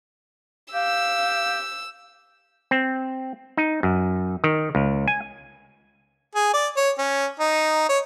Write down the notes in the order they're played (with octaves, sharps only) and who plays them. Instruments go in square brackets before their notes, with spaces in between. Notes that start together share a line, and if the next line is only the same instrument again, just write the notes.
[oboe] G4 [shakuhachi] F5 [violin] E6
[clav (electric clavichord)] C4
D#4
F#2
D#3
C#2
G#5
[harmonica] G#4
D5
C#5
C#4
D#4
C#5